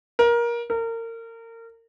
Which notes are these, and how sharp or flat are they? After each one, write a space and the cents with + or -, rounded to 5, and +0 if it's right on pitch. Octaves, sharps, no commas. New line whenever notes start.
A#4 +20
A#4 -30